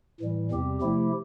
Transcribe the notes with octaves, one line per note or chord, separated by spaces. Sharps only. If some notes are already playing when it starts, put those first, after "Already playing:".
A2 E3 G3
E2 C3 G3 C4 G4
C3 F3 A3 E4 G4